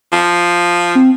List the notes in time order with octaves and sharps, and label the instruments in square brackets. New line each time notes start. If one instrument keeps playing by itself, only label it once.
[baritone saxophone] F3
[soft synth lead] C4